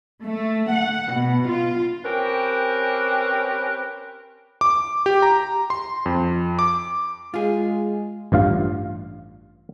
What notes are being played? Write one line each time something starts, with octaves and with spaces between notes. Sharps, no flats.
A3
F#5
B2
F4
C4 C#4 G4 A#4 B4
D6
G4
A#5
C6
F2
D6
G#3 F4 G#4
A1 G2 F4 F5